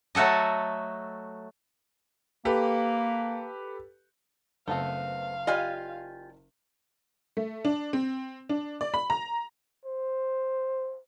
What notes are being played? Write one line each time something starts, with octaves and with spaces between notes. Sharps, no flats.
F#3 A3 F#4 A4 D#5
A#3 G4 A4 B4
F#1 A3 B3 C4 F5 A5
F4 G4 D5 D#5 G#5
A3
D4
C4
D4
D5
B5
A#5
C5